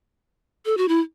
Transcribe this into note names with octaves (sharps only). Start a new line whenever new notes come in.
A4
F#4
E4